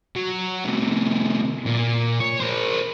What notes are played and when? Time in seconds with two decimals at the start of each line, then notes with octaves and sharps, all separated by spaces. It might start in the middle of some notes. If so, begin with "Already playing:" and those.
0.16 F#3
0.65 A2 C3
1.66 A#2
2.20 C#5
2.40 A#4 C5